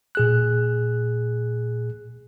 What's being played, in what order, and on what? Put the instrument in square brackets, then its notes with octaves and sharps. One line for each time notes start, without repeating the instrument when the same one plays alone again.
[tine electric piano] A#2 G#4 F#6